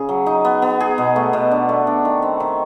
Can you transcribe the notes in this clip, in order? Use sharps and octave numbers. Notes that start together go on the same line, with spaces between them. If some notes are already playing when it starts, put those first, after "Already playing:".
Already playing: C#3 G#4
F#3
D#4
B3
B3
G#4
B2
A3
B2
D4
A3
D4
D#3
C4
D#3